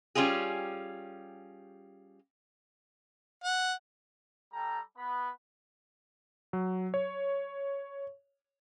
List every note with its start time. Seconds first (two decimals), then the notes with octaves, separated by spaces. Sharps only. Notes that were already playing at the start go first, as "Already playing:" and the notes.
0.15 G3 C#4 F4 G4 G#4
3.44 F#5
4.53 G3 A4 G5 A#5
4.96 B3 B5
6.53 F#3
6.94 C#5